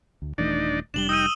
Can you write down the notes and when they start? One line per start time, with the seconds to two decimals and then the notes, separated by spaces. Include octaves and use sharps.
0.22 D2
0.38 D#1 E3 A3 D4 D#4 D5
0.94 F1 A#2 G3 D4 E7 F#7 G7
1.09 D#4 G5 D#6 E6 D#7